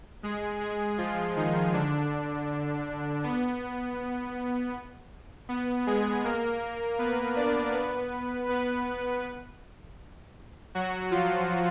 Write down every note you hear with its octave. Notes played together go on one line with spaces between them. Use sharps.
G#3 G#4
G#3 G#4
F3 F4
D#3 D#4
D3 D4
B3
B3
G#3 G#4
A#3 A#4
B3 B4
D4 D5
B3 B4
B3 B4
F#3 F#4
F3 F4